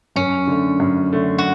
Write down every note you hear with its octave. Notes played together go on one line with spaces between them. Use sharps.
F#2 C#4
D3 A3
F#2
D3 A3
F#4